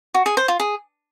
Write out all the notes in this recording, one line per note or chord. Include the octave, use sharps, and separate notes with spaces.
F#4
G#4
C5
F4
G#4